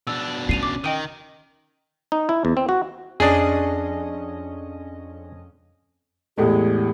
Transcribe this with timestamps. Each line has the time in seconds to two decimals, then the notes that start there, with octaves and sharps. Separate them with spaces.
0.07 B2 D4 E6
0.49 C#4 C7 D#7 F7
0.63 D6
0.84 D#3 D#5 G5 D#7
2.12 D#4
2.29 E4
2.45 E2
2.57 C4
2.69 F#4
3.20 F2 C#4 D4 G#4 D#5
6.38 E2 A2 G#3 G4